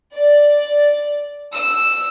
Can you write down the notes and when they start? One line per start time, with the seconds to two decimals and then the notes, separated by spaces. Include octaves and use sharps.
0.14 D5
1.55 E6